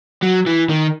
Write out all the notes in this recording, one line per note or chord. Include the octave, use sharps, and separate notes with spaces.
F#3
E3
D#3